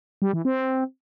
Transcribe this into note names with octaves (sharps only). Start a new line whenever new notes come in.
G3
E3
C4